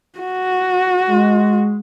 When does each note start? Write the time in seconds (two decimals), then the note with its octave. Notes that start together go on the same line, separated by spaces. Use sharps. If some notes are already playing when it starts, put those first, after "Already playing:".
0.19 F#4
1.09 G#3